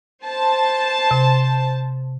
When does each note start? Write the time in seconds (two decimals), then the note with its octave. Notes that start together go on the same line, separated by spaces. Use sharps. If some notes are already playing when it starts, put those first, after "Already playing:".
0.23 C5 A5
1.11 C3